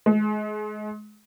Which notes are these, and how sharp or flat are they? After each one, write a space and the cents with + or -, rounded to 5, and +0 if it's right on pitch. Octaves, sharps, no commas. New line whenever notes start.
G#3 +30